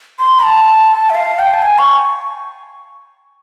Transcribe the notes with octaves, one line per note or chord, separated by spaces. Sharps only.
C6
A5
E5
F5
G5
A5
G#5
C#6